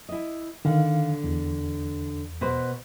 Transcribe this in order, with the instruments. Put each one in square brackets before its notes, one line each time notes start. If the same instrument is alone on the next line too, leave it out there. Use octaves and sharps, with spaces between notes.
[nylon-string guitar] E4 D#5
[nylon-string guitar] D3 [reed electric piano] D#3 F5
[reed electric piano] E2
[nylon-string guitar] B2 B4 C5